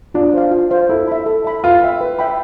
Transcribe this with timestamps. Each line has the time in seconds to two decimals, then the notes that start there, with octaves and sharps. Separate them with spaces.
0.14 D4 F4
0.34 C5 F5
0.51 F4
0.70 C5 F5
0.89 E4 A4
1.08 E5 B5
1.26 A4
1.44 E5 B5
1.64 F4 B4
1.82 E5 G5 B5
2.01 B4
2.19 E5 G5 B5